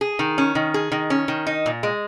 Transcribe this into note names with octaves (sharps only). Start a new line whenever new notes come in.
G#4
D#3
C#4
D#3
G#4
D#3
C#4
D#3
D#4
A#2
G#3